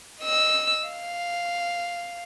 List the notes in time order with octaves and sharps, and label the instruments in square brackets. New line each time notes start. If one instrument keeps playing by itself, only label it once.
[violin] D#5 E6
F5